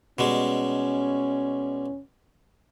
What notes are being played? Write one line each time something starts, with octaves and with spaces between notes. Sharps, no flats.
B2 G3 G#3 C#4